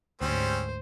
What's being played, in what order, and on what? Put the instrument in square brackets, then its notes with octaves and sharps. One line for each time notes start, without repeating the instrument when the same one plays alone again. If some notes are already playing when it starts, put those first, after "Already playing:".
[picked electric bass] D2 [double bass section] G#2 [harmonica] G3 C4 C#4 [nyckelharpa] C5